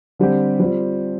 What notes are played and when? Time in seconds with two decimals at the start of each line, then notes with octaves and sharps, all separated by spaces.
0.19 D3 G3 C4 G4
0.60 G3 C4 F4